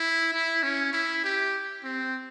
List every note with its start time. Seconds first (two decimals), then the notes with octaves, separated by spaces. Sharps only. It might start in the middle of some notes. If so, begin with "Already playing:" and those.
Already playing: E4
0.33 E4
0.63 C#4
0.93 E4
1.24 G4
1.84 C4